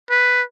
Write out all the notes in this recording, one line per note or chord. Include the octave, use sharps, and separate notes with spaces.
B4